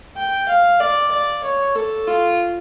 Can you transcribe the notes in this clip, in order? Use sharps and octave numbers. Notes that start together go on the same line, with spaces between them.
G5
F5
D5
D5
C#5
A4
F4